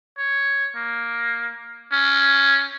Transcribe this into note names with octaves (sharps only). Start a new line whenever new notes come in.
C#5
A#3
C#4